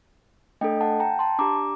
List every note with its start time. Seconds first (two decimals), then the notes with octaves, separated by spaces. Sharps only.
0.61 A3 D4 A4 D#5 G5
0.81 F#5 A5
1.00 G5 A#5
1.19 A5 C6
1.39 D4 G4 A#5 D6